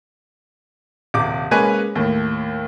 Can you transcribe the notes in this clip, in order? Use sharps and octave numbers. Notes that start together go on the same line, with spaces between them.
D#1 C3 D6
G#3 A#3 C#4 B4 C#5 G#5
D#2 A2